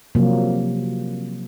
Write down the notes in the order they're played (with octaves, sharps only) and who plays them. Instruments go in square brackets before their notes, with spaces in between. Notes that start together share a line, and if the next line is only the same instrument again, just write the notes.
[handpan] C3 F3 F#3 A#3